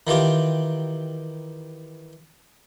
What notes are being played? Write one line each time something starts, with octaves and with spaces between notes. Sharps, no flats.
D#3 E3 F4 G4